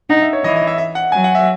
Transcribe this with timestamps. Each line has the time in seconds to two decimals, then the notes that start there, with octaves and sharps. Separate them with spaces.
0.10 D#4 F#5
0.22 E5
0.33 C#5
0.44 E3 D#5
0.56 D#5
0.67 E5
0.78 E5
0.95 F#5
1.12 F#3 G#5
1.24 F#5
1.35 E5